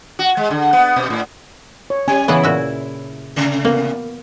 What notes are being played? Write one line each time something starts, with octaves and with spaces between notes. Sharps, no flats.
F#4
G#3
D3
B3
B2
A2
C#5
G3 C#4 G#5
C#3 E3 B3 E4 C#5
A#2 F#4 E5
C3 A3
A#3 B3